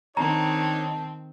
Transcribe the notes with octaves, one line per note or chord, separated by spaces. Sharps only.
D#3 C4 D4 D#4 C#5 A5 A#5